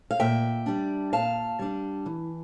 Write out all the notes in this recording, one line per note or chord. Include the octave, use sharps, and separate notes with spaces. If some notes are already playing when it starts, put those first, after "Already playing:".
F5
A#2 E5 G5
G3 D4
A#2 F5 A5
G3 D4
E3